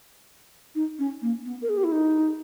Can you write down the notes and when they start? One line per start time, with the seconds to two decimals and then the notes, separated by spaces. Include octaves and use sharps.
0.75 D#4
0.99 C#4
1.22 A#3
1.45 B3
1.62 A#4
1.69 G#4
1.77 G4
1.84 E4
1.92 D#4